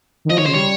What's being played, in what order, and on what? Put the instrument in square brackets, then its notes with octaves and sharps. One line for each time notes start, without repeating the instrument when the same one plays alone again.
[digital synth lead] D#3
[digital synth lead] F3 [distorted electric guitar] D#5
[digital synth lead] D#3 [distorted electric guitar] C#5
[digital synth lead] C#3 [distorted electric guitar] C5
[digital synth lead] G3 [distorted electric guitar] C#5